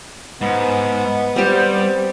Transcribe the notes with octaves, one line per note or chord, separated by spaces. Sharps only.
G#2 B3
G3 C4 G4